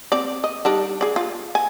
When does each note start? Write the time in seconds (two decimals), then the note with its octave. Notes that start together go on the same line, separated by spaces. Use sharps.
0.12 C4 D5
0.44 D#5
0.65 G3 D4 D#4
1.01 G#4 D5
1.16 F4
1.55 G#5